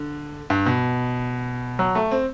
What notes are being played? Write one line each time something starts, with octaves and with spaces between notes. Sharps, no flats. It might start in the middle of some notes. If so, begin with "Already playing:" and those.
Already playing: D3
G2
B2
F#3
A3
C4